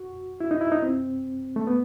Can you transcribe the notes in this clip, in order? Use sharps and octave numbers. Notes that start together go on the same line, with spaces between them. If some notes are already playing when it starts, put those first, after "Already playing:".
Already playing: F#4
E4
D#4
E4
D#4
C4
A3
B3